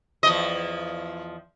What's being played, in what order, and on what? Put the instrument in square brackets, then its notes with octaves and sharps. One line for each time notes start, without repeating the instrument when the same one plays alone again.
[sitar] E2 F3 D#5